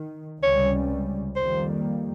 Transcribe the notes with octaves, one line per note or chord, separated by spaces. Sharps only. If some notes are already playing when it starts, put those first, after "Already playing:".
Already playing: D#3
C#2 C3 G3 C#4 C#5
F2 D#3 G3 A#3 C5